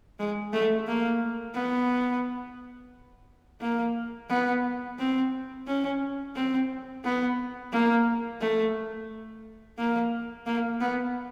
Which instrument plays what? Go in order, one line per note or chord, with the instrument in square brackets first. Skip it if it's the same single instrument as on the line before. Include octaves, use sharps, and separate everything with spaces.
[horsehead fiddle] G#3
A3
A#3
B3
A#3
B3
C4
C#4
C4
B3
A#3
A3
A#3
A#3
B3